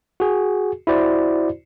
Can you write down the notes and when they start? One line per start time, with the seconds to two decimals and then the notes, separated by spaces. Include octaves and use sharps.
0.20 F#4 G#4
0.87 E4 F#4 C5 D5